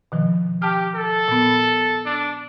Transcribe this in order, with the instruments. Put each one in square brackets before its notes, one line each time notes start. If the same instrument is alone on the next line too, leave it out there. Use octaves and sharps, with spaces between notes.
[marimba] B2 D#3 F3
[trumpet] G4 [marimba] G5 A5 F6
[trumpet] A4
[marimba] A#2 B3
[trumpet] D4